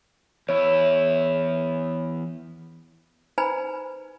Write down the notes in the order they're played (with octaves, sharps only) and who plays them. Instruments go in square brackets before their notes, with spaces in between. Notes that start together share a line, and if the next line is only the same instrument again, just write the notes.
[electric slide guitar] E2 E4 [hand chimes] C#5
[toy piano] D#4 B4 C5 G#5 A#5 B5